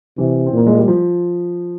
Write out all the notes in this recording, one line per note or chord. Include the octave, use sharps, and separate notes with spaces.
C3 E3
C4
A#2 A#3
G#3
G3
F3